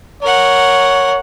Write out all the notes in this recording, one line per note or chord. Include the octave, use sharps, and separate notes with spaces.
A#4 C#5 F#5